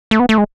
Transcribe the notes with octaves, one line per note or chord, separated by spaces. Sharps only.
A3
B3
A3
G#3